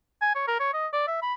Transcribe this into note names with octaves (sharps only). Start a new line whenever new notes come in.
G#5
C#5
A#4
C#5
D#5
D5
E5
B5